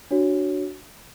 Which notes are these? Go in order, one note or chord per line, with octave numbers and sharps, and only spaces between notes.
D4 F#4 C#5